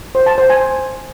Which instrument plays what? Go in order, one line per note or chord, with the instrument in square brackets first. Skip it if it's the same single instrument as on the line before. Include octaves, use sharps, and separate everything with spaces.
[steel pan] C5
A5
C5
G#5